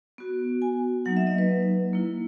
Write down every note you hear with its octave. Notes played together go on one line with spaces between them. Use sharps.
B3 F#4
G#5
F#3 A#3 D#4 F#5
E5
D#5
B4
A#3 E4